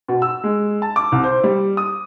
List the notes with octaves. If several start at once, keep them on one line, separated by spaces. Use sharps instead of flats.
B2
E6
G#3
A5
D6
C2
C5
G3
D#6